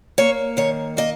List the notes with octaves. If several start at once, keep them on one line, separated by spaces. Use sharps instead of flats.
A#3 C#5
D#3 C#5
A#3 D#5